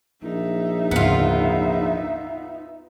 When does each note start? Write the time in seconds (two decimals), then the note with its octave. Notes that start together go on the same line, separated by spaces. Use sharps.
0.23 A#1 D#4 E5
0.91 D2 G#2 C#3 B3 F4